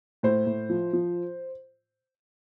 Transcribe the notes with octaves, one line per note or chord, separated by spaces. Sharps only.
A2 C5
A2
F3
F3